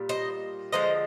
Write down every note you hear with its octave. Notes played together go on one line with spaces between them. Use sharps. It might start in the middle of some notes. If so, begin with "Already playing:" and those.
Already playing: A#2 G3
C5 D#5
D3 F3 G#3 C5 D#5